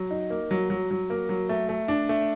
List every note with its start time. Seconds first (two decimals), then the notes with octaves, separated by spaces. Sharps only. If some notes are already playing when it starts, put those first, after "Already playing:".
Already playing: F#3
0.11 D#4
0.30 A#3
0.51 F#3
0.70 F#3
0.91 F#3
1.10 A#3
1.29 F#3
1.49 A3
1.69 A3
1.88 D4
2.09 A3